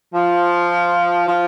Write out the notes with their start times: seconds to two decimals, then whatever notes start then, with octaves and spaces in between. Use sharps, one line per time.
0.14 F3
1.28 F3